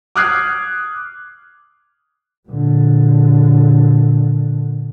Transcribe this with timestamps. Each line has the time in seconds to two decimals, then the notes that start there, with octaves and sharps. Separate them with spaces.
0.16 D6 D#6 F6 F#6 G#6 C7
2.49 A#2 D3